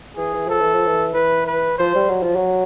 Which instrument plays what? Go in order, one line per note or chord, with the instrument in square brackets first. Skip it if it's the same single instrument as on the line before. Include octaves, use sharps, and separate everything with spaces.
[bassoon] E3 [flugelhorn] G#4
[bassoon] E3
[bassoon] F3 [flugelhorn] A4
[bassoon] E3
F3
E3
[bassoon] E3 [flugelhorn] B4
[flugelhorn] B4
[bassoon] F3 [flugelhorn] C5
[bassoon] G3
F#3
F3
F#3